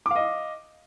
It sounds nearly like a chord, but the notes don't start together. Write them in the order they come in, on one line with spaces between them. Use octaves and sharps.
D6 F5 D#5